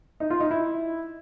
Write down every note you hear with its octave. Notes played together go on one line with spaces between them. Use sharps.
D#4
F4
D#4
E4